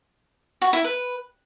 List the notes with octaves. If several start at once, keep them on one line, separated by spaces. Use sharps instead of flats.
F#4
E4
B4